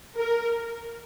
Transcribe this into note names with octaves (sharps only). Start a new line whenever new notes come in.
A#4